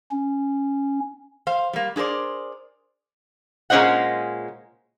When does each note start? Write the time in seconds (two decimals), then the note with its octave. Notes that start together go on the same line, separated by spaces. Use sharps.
0.11 C#4
1.47 C5 F5
1.73 G3 A#3
1.96 D4 G#4 A#4 C5 D5
3.70 A#2 G#3 C#4 C5 D#5 F#5